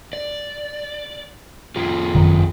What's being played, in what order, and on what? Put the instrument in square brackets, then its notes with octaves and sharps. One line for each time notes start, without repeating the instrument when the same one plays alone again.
[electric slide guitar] D5
F2 F4 G#4
[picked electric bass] G#1 F#2 D#3